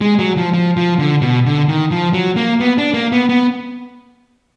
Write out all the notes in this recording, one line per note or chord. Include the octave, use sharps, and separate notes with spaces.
G#3
F#3
F3
F3
F3
D3
B2
D3
D#3
F3
F#3
A#3
B3
D4
A#3
B3
B3